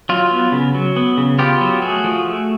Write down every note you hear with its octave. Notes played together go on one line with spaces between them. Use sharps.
F#3 F4
B3
C#3
F#3
B3
C#3
B3 F4 G4
F#3
A3 F#4 G#4
F3
A3